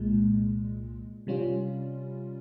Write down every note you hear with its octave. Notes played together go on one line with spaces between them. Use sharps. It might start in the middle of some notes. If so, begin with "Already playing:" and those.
Already playing: C2 A#2 G#3
C3 G3 C#4 F4